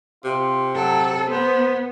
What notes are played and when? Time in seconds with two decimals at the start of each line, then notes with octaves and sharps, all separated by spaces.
0.24 C3 F4
0.76 F#3 A4
1.31 B3 C5